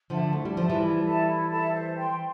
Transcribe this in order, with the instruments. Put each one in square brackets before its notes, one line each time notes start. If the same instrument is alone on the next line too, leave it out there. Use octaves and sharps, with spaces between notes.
[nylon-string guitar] D3 F3 [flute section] A4 E5 A5
[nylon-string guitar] A3 [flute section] E4
[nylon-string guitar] G3
[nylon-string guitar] F3 [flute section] A4 E5 A5
[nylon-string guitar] E3 G3
[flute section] E4
A4 E5 A5
E4
A4 E5 A5
C5
G5 C6